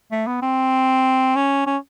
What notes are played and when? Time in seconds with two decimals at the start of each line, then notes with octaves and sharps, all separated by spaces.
0.12 A3
0.27 B3
0.42 C4
1.36 C#4
1.67 C#4